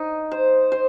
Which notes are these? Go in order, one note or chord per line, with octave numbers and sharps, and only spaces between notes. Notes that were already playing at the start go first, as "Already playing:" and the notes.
Already playing: D#4
C5
C5